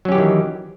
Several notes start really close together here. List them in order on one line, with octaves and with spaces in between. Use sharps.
F#3 C#4 G4 E3 D#3